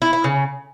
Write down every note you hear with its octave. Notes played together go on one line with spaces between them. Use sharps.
E4
E4
C#3